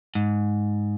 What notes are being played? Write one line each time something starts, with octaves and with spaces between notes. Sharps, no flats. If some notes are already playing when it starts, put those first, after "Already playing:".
G#2